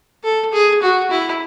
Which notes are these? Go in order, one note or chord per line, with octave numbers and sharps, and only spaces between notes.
A4
G#4
F#4
E4